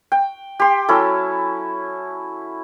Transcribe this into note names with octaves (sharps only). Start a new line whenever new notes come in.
G5
G4 C6
F#3 C#4 E4 A4